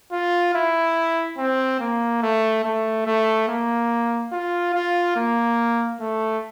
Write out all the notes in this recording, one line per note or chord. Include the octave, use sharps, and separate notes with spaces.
F4
E4
C4
A#3
A3
A3
A3
A#3
F4
F4
A#3
A3